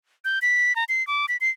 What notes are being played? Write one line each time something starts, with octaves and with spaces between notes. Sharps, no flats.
G6
B6
A#5
C7
D6
B6
C7